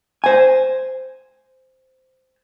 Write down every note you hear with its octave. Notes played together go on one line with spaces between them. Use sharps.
C5 G#5